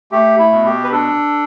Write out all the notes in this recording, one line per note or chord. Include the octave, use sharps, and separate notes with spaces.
A3 G4
E4
B2
G4
B4
D4 A4